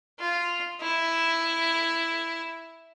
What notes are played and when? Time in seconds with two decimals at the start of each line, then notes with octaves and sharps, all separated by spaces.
0.19 F4
0.81 E4